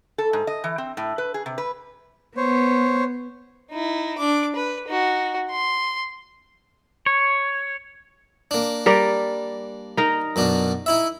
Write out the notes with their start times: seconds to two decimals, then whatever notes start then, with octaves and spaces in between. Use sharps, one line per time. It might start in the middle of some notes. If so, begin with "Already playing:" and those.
0.18 A4
0.33 G#2
0.47 D#5
0.64 E3
0.78 C4
0.97 A2
1.18 B4
1.34 G#4
1.46 C3
1.58 B4
2.37 B3 C5 C#5
3.71 D#4 E4
4.18 D4 D6
4.55 B4
4.88 D#4 F#4
5.51 C6
7.06 C#5
8.51 A#3 D4
8.86 G3 A#4 D5
9.97 D#4 A#4
10.36 F#2 B2 D4
10.86 D#4 E4 E5